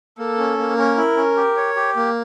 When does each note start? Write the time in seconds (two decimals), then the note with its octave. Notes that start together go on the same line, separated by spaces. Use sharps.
0.19 A#3 A4
0.38 C#4
0.58 A#3
0.78 C#4 A#4
0.97 E4
1.17 C#4
1.37 G4
1.57 C#5
1.76 G4
1.96 A#3